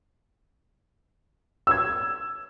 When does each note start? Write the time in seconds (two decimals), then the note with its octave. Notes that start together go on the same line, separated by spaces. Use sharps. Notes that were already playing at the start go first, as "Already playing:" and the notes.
1.67 E6 G#6